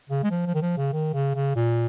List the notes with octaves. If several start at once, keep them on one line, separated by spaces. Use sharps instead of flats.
C#3
G#3
F3
F3
D#3
F3
C#3
D#3
C#3
C#3
A#2